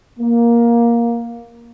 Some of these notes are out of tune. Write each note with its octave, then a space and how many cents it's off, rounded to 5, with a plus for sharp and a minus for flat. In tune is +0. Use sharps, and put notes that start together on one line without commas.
A#3 +10